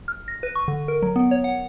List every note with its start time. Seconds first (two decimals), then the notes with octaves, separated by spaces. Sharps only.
0.08 F6
0.28 A#6
0.43 B4
0.55 C#6
0.68 D3
0.88 A#4
1.02 F#3
1.16 B3
1.31 C#5
1.44 F#5